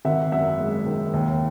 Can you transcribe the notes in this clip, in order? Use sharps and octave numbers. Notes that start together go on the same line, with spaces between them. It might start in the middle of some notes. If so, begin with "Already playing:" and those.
G#1 E5 F#5
F#2 E5 F#5
G#3
D#3
D#2